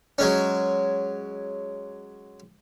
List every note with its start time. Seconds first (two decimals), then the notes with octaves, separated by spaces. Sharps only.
0.18 F#3 G#3 C#4